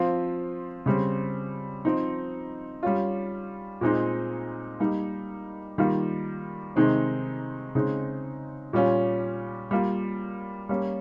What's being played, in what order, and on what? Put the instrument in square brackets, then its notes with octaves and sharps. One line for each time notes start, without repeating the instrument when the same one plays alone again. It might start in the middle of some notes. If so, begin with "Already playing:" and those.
Already playing: [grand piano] F3 C4 F4
C#3 G3 C4
F3 C4 D#4
G3 C#4 F4
A#2 G#3 C4 D#4
G3 A#3 D#4
D#3 G3 A#3 F4
C3 D#3 G#3 C4 D#4
C#3 G#3 C4 D#4
A#2 G3 C#4 F4
G3 A#3 F4
G3 A#3 C#4